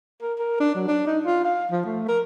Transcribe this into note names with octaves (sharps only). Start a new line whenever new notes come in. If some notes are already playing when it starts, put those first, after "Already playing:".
A#4
A#4
D4
F#3
D4
D#4
F4
F5
F3
A3
A#4